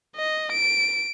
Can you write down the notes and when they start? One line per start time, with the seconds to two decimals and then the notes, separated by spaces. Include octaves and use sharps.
0.16 D#5
0.52 D7